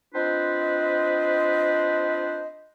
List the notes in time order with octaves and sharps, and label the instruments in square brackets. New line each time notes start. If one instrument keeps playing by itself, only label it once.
[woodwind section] C4 D4 F4 B4 C5 D#5